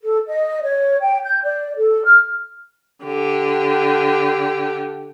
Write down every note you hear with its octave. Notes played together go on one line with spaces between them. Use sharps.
A4
D#5
C#5
G5
G6
D5
A4
F6
D3 G4